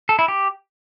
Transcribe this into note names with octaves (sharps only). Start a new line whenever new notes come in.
A4
E4
G4